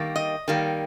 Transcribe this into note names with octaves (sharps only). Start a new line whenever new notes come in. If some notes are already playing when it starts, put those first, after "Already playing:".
Already playing: D#3 G3 A#3
D#5
D#3 G3 A#3